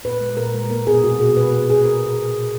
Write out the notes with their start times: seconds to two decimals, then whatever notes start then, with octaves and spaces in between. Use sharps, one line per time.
0.05 A#2 B4
0.21 G#3
0.37 A#2 A#4
0.54 G#3
0.70 A#3 A#4
0.87 B2 G#4
1.04 B2 F#4
1.20 B2 G#4
1.37 B2 B4
1.53 B2
1.70 B2 G#4
1.85 B2 A#4
2.01 A#2
2.18 A#2
2.34 A#2